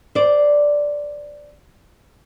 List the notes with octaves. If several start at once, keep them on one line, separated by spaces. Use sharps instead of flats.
C5 D5